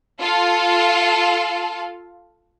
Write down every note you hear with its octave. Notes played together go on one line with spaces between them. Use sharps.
F4 A4 F5